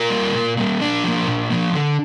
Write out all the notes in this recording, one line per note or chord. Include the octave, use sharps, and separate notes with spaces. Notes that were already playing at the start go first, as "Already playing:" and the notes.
Already playing: F4 A#4
G3 A#3
A#2
G3 A#3
A#2 D4
F3 A#3
A#2
F3 A#3
D3